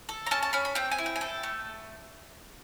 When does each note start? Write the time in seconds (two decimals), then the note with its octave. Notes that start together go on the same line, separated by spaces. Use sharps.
0.09 A4
0.27 A#5
0.31 C#4 A5
0.43 A5
0.53 C#4 B5
0.65 B5
0.75 C4 G5
0.92 G#5
0.98 E4
1.06 G5
1.16 G#5
1.21 A4 G5
1.43 A3